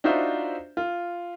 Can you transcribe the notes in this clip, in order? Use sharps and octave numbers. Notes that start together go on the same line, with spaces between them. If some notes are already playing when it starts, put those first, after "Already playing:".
D4 D#4 F4 F#4 C5 E5
F4